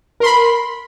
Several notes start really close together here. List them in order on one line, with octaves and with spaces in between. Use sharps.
A#4 C6 B5